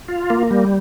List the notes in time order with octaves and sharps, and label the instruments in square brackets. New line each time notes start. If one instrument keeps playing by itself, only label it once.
[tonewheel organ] F4
A#3
G3